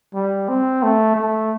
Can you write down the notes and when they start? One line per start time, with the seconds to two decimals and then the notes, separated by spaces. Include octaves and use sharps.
0.15 G3
0.49 C4
0.83 A3
1.16 A3